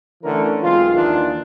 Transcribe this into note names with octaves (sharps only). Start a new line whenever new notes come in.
D3 E3 A3 C#4 A#4
B1 G#3 C4 F4
D#2 D#3 E3 D4 E4 F4